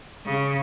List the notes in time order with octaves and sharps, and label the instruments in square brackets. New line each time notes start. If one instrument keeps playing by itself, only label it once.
[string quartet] C#3